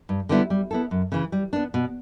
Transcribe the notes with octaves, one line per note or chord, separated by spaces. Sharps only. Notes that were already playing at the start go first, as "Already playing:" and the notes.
G2
D3 G3 B3 E4
G3
B3 E4 A4
F#2
C#3 E3
G3
B3 D4
B2